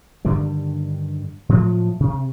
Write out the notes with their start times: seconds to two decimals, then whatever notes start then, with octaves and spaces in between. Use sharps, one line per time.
0.25 G2 D3 D#3 G3
1.49 A2 F3 F#3 A3
2.00 C3